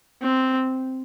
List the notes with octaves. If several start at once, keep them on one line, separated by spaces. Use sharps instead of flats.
C4